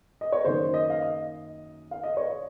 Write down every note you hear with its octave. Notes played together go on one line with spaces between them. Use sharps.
D#5
C#5
F#2 D#3 F#3 A#3 C5
D#5
F5
D#5
F5
D#5
C#5